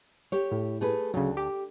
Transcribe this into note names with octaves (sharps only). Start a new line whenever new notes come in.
G4 C#5
A2
A3 G#4 B4
D2 C#3 F#3
G4